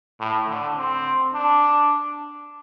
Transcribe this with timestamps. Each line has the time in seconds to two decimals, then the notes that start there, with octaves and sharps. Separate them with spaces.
0.20 A2
0.48 D3
0.77 C4
1.33 D4